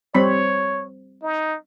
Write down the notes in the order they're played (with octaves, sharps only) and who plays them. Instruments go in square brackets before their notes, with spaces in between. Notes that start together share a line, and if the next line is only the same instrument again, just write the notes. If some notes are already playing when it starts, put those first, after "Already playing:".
[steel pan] G3 C4 B5 [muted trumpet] C#5
[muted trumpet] D#4